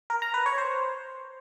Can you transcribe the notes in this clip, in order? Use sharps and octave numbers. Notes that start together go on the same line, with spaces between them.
A#4
A#5
B4
C#5
C5